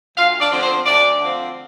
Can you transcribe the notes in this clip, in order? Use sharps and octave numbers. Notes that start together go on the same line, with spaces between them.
D2 F4 F5
D4 D5
D3 F3 C4
C4 C5
D2 D4 D5
D3 F3 C4